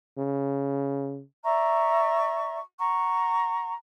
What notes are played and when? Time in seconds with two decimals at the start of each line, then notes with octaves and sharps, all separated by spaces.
0.18 C#3
1.44 D5 E5 A#5 C#6
2.79 F#5 A#5 C#6